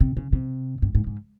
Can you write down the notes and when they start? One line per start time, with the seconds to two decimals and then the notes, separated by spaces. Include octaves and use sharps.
0.01 C3
0.17 C#3
0.33 C3
0.82 G2
0.95 G#2
1.07 G#2